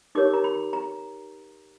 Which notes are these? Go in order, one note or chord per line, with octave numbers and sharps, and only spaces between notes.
D#4 G4 A#4 C#5 D6
A#5
B5
A#5